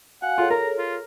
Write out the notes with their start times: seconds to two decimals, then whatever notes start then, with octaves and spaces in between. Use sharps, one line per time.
0.22 F#4 F5 F#5 G#5
0.38 F4 G#4 A4 C#5
0.50 A#4 A#5
0.78 F4